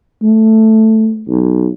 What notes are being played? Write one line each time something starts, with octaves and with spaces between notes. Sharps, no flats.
A3
B1